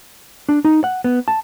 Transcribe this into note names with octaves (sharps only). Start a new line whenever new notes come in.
D4
D#4
F#5
B3
A5